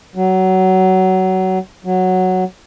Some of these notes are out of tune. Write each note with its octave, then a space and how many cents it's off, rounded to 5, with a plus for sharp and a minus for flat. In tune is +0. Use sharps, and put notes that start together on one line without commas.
F#3 +20
F#3 +0